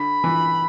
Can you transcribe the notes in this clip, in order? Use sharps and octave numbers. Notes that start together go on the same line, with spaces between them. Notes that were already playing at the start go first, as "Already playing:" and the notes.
Already playing: D3 B5
E3